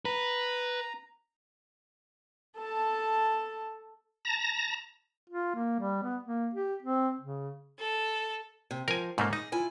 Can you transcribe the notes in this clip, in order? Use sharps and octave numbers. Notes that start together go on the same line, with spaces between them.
B4 A#5
A4 A5
A5 A#5 A#6
F4
A#3
G3
B3
A#3
G4
C4
C#3
A4
C3
F3 A#4 G#5
G#2 A3 A#3 C#4
D#4 G#4
E4 F4 G#5